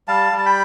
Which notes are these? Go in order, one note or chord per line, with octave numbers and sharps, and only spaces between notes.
G3 F5 A5
G3
A5
G5 B5